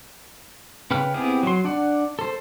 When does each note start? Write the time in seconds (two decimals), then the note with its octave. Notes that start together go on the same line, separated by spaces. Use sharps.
0.91 C#3 B4 G5 F6
1.14 B3 C4 E4 G4 G#4
1.43 F#3 C6
1.64 D4 D5 F#5
2.19 A4 C5